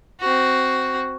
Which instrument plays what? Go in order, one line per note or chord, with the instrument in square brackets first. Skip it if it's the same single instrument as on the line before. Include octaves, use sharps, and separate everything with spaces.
[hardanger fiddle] C4 F#4